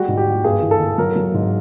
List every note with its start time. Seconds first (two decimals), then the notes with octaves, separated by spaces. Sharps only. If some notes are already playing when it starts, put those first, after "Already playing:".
Already playing: G3 G#3 F#4
0.08 G#2
0.17 G4
0.26 F3
0.44 G2 G#4
0.62 E3
0.71 A4
0.80 E3
0.98 F#3 A#4
1.16 F#3
1.34 G#2